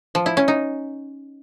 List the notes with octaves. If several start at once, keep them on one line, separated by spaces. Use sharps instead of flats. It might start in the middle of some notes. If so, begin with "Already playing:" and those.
F3
E4
C#4
D#4